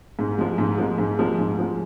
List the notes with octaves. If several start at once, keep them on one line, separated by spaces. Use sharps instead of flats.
G#2
F3 G#3
G#2
F3 G#3
G#2
F3 G#3
G#2
F3 G#3